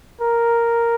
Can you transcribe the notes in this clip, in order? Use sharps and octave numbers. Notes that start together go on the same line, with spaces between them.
A#4